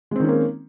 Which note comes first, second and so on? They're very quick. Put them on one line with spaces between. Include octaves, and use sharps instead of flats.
G#3 C4 D#3 C#4 A#3